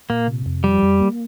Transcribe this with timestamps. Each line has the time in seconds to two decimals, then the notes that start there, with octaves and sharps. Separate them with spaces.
0.10 A#2 A#3
0.28 C3
0.46 F2
0.64 F3 G3
0.82 F2
1.00 A#3